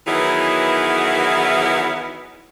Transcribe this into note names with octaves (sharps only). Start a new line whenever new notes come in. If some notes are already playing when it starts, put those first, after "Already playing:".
D#3 E3 F#3 B3 E4 G#4